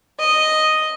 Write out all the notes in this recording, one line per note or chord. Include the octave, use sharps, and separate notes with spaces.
D#5